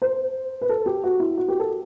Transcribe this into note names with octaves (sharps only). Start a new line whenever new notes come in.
C5
B4
A4
G4
F#4
E4
F#4
G4
A4